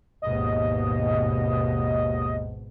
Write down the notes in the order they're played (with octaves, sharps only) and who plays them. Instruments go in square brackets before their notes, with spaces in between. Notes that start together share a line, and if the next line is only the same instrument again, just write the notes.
[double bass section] G#1 B2 [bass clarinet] D#2 [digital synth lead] D#5